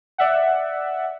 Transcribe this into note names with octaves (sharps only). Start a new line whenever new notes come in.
D5 E5 F#5